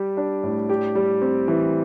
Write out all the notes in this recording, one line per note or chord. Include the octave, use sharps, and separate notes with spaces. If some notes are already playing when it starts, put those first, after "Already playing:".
Already playing: G3 G4
D4
A2
G4
G3
C4
E3